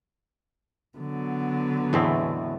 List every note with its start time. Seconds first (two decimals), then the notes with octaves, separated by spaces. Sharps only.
0.98 D3 F#3 B3
1.93 E2 A2 E3 G#3 A3 C4